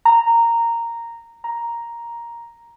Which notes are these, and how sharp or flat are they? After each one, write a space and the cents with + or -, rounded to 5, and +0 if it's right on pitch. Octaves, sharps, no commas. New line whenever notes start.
A#5 -10
A#5 +5